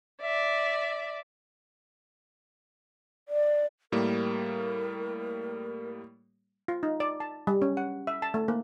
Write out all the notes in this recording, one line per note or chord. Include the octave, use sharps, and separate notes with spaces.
D5 E5
D5
A2 G3 A#3 A#4
F4
D#4
D5
A5
G3
C#4
F#5
E5
A5
A3
A#3